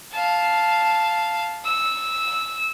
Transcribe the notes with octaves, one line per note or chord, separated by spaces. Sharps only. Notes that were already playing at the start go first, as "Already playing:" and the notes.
F5 A5
E6